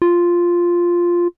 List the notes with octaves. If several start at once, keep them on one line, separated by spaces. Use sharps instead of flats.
F4